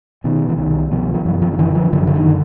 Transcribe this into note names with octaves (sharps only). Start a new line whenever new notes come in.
B2 D#3
E3
C2 D#3
B2 F3
F3
F#2 E3
F3
D#3
D3 E3
F3
F#2 D3
D3
D#3
D3